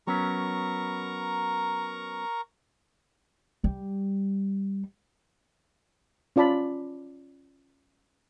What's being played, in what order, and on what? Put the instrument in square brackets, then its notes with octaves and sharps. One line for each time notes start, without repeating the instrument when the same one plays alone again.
[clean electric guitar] F#3 B3 C#4 [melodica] A#4 A#5 C#6
[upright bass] G3
[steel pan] C#4 F4 D5 A5 B5